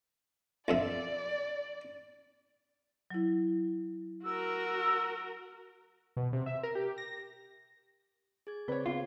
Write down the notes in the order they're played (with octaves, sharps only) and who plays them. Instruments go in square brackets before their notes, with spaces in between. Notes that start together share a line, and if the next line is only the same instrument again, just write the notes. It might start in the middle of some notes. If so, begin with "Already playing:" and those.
[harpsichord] A#1 F2 E5 [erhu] D5
[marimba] F#3 E4
[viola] F#4 A#4 [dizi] E6
[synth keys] B2
C3
E5
A#4
G4
A#6
[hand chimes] G#4 G#6
[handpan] C#3 C4 D5 [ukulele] B4 C#5
[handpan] B3 C4 [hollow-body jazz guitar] F4